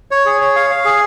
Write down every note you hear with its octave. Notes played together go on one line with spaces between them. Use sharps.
C#5
G#4
C#5
F5
F5
G#4